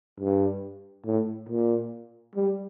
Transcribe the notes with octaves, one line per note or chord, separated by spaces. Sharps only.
G2
A2
A#2
G3